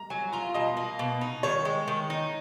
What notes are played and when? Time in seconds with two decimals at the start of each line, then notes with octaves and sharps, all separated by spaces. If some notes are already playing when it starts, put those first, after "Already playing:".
Already playing: A#5
0.10 F#3 G#5
0.33 F4 A#5
0.54 B2 D#5
0.77 A#3
0.99 B2
1.21 D#4
1.43 D#3 C#5
1.65 G#3
1.88 D#3
2.10 D#4